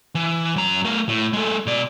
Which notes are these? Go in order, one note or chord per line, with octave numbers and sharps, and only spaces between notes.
E3
F#2 A#5
A3 A#4
A2
G#3 A4
B2 D5